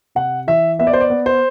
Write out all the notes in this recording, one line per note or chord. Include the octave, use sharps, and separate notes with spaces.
C3 F#5
E3 E5
B3 E5
D5
C5
D5
B3
C5